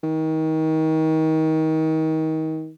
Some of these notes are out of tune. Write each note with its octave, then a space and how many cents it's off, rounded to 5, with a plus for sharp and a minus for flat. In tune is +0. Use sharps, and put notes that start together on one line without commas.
D#3 +30